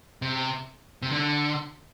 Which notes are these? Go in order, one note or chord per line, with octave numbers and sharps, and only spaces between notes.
C3
C3
D3